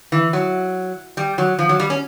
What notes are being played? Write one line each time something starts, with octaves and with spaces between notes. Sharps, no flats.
E3
F#3
G3
F#3
F3
F#3
G3
C#4